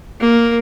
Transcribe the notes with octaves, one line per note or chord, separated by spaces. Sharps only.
A#3